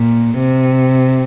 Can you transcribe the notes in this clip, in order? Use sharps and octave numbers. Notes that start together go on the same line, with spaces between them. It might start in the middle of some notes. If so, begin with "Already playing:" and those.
Already playing: A#2
C3